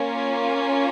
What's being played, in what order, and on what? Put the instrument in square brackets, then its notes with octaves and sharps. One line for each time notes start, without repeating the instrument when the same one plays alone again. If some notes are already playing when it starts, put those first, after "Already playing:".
Already playing: [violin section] A#3 C#4 F4